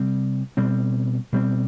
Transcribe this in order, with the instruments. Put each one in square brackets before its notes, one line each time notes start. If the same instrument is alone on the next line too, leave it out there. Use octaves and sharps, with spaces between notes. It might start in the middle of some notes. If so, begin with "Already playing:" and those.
Already playing: [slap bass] C3 G3 C4
B2 G3 C4
B2 G3 C4